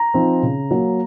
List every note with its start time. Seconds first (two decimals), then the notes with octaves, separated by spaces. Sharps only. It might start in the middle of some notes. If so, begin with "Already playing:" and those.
Already playing: A#5
0.14 F3 C4 D#4
0.43 C#3
0.71 F#3 A#3